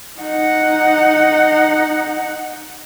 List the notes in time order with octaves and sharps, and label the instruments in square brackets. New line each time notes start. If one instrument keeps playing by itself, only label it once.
[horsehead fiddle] D#4 F#5